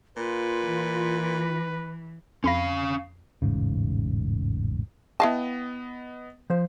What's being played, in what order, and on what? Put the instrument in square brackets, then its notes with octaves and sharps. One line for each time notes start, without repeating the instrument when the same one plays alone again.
[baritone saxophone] A#2 [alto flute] F4 [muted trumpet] B4
[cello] E3
[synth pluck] F2 B5 A#6 [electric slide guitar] C#4 F5
[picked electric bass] E1 A1 G#2 C#3
[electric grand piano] B3 D#5 [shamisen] E4 F5 A5 [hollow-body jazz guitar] G5
[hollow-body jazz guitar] F3 C5